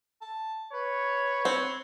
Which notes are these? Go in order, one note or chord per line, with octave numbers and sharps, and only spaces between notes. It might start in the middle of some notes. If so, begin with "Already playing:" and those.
A5
B4 C#5
C4